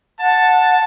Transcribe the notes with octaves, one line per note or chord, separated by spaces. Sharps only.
F#5 A5